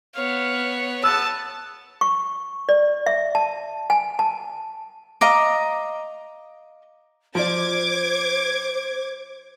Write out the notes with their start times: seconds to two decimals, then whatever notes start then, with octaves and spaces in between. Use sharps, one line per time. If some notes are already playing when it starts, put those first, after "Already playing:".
0.15 B3 C#5 F5
1.04 B3 A5 E6
2.01 C#6
2.69 D5
3.06 E5
3.35 A5
3.90 G#5
4.19 A5
5.21 D#5 F5 A#5 D6
7.35 F3 C5 D5 D6 G#6